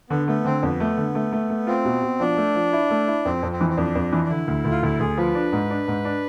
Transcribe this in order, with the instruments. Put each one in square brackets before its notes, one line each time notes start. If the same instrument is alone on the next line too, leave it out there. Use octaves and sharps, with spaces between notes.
[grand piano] D3 [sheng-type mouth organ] B3
[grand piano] A3 [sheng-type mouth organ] B3
[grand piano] D3 [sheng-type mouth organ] C4
[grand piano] F2 [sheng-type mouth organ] B3
[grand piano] A3
D3
A3
A3
A3
[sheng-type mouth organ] C4 [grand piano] F4
[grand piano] B2
B2
[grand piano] F3 [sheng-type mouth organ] D4
[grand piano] A3
F3
E4
A3
E4
[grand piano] F2 [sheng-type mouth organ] C4
[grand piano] F2
[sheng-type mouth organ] C4
[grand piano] E3
[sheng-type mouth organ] C4
[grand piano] F2 [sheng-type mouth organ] D4
[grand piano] F2
E3
[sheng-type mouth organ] D4
[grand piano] D3 [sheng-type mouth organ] E4
[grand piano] D2
D2
[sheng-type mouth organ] F4
[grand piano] D2 [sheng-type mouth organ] E4
[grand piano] D2 [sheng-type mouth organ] G#4
[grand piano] F3 [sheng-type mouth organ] B4
[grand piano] D4
G#2
D4
G#2
D4